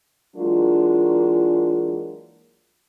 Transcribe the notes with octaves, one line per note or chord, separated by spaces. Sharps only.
E3 F#3 G#3 A#3 D4 F4